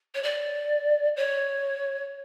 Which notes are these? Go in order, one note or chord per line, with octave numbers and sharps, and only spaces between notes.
C#5
D5
C#5